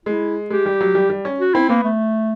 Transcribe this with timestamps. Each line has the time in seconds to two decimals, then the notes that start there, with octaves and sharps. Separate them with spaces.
0.06 G#3 E4
0.50 G#3 G4
0.66 G3
0.81 F#3
0.95 G3
1.10 G3
1.25 C#4
1.40 F#4
1.54 C4 E4
1.69 A#3 B3
1.84 A3